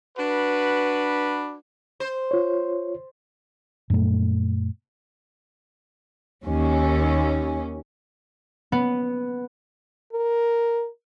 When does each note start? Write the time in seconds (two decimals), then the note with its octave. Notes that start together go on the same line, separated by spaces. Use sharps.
0.18 D4 F#4 B4
2.00 C5
2.31 F4 C#5
3.90 F#2 A#2 A3
6.45 D#2 C#4
8.72 B3
10.13 A#4